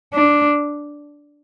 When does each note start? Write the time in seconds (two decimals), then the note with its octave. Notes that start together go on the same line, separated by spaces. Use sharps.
0.13 D4